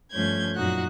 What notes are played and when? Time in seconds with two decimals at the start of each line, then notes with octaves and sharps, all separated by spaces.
0.12 G2 F3 A3 C#4 G6 G#6
0.55 F#2 A#2 D#4 F#4 F#6